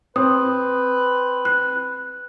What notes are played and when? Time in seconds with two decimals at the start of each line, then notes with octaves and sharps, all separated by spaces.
0.16 C4 B4 D#6
1.45 F#6